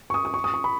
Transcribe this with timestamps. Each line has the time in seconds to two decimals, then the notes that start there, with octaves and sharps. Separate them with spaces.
0.10 C#6
0.14 D#6
0.25 D#6
0.34 C#6
0.44 D#6
0.54 C#6
0.64 B5